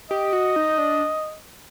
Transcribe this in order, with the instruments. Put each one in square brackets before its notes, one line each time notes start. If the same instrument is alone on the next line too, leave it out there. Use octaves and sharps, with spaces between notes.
[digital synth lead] G4 [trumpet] D#5
[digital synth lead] F#4
D#4
D4